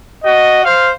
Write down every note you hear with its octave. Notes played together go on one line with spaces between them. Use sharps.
F#4 D#5
C5 F5